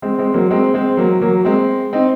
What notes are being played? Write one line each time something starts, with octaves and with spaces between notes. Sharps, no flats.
G#3 C4
G#3 C4
F#3 A#3
G#3 C4
G#3 C4
F#3 A#3
F#3 A#3
G#3 C4
C4 D#4